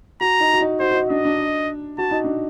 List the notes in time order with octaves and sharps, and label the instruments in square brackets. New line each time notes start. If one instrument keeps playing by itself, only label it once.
[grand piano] F#4 [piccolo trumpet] A#5
[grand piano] D#4
F#4
D#4
[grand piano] F#4 [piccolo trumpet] C5
[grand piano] F#4
D#4
[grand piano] D4 [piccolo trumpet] D#5
[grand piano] D4
[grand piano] F#4 [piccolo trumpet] A5
[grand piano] D#4
D4